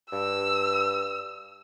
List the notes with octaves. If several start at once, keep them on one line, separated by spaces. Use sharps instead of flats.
G2 E6